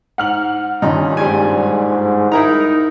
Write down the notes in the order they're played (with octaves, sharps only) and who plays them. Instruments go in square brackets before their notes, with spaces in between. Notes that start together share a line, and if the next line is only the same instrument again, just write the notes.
[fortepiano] G#2 [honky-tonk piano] F#5 F6 F#7
[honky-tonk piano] G2 A#2 D#3 [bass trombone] C#4 [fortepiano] D#4
[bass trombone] G#2 [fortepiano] G3 D5 G#5
[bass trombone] D#4 [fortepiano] E4 A#4 A#5